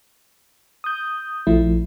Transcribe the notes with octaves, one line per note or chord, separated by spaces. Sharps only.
D#6 G6
A#1 F3 A3 E4